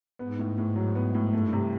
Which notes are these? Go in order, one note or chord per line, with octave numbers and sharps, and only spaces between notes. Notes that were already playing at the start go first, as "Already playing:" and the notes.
G#2 B3
A2
A2
G#2 F#3
B3
G#2
A2
G2 A3
C3